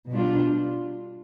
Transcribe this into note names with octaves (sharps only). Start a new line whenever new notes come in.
B2 G3 D4 F4